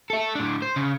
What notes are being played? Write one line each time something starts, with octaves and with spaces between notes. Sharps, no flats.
A4 E5
A2 D4
C5
C#3